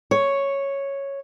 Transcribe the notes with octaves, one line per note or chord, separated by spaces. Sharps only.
C#5